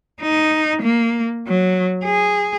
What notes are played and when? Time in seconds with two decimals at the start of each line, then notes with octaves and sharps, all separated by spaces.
0.22 D#4
0.83 A#3
1.48 F#3
2.04 G#4